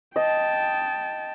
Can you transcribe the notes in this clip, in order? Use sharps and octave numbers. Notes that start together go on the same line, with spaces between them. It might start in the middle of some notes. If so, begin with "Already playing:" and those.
D#5 G5 A5